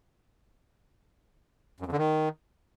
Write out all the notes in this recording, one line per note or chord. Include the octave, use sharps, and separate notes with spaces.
F#2
F2
D3
D#3